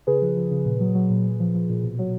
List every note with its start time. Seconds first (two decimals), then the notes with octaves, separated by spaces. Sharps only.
0.07 C#3 G#4 B4
0.22 F3
0.36 F3
0.51 C#3
0.65 A#2
0.80 F#3
0.95 F#3
1.10 A#2
1.24 A#2
1.40 F3
1.55 F3
1.70 A#2
1.83 B2
1.99 F#3